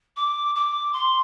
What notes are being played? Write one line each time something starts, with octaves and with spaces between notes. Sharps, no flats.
D6
D6
C6